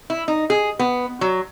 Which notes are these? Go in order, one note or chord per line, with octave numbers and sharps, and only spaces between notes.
E4
D#4
G#4
B3
F#3